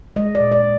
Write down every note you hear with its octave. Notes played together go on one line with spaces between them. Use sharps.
G#3 D#5
D5
A#2
D5